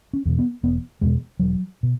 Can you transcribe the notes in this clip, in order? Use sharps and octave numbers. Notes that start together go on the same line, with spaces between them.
C#4
E2 B2
B3
E1 B3
E2 B2 G#3
E1 F#3
B2